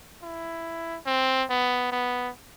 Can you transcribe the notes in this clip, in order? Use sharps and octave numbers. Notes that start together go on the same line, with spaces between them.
E4
C4
B3
B3